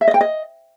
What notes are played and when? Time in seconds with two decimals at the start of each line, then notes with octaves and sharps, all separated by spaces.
0.01 E5
0.08 D#5
0.14 G5
0.21 D#5